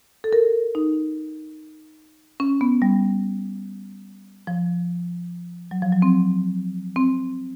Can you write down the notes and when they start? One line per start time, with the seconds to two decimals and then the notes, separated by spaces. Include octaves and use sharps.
0.24 A4
0.33 A#4
0.75 D#4
2.40 C#4
2.61 B3
2.82 G3
4.47 F3
5.71 F#3
5.82 F3
5.92 F#3
6.02 C4
6.96 C4